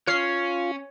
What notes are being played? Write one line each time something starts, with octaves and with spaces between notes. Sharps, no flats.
C#4 F4 C#5 F6 C7